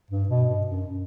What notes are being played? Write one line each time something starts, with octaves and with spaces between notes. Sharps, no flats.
G2
B2
G2
F#2